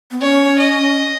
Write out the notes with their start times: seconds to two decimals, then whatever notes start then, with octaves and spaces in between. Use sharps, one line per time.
0.11 B3
0.21 C#4 C#5
0.59 D#5